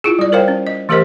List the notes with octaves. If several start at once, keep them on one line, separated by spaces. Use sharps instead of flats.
E4 F4 G#4
G3 D5
A#4 C5 C#5 F5 G5
C#4
D#5
E3 A3 G4 A#4 C5 D#5